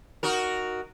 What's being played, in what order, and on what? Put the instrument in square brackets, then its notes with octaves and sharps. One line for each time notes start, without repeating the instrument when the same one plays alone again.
[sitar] D#4 F#4 A#4